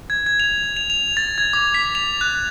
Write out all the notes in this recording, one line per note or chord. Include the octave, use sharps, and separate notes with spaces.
G#6
G#6
F7
F7
F7
A6
G#6
D6
B6
F7
F#6